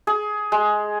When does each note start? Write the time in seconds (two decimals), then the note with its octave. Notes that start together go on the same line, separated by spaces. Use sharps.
0.07 G#4
0.52 G#3